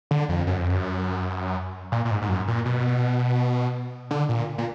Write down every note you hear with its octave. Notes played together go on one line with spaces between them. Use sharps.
D3
F2
F#2
F2
F#2
A#2
A#2
G#2
G#2
F#2
A#2
B2
D3
A#2
A#2